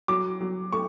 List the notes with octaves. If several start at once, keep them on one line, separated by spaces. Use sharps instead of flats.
F#3 D6
F#3
A3 C#6